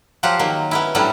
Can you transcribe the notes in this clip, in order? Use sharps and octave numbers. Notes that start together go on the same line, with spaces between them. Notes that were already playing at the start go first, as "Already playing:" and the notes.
F3 F#3 F4 G4 F#5
D#3 F#3 A#3
B3 C#4 E4
A2 F#3 G3 C#4 D4 E4